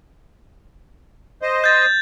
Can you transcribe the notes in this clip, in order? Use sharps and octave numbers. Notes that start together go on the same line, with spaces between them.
C5 D#5
G6 A6